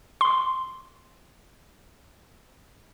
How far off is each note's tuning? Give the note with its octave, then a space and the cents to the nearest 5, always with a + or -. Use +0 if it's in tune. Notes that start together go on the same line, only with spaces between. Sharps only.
C6 -5